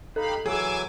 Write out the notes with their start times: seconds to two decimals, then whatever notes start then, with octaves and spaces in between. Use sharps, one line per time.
0.16 D#4 G4 A4 F5 B5
0.46 E3 F#3 G#4 G#5 D6 E6